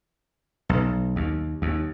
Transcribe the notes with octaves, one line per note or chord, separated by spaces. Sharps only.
B1
D#2
D#2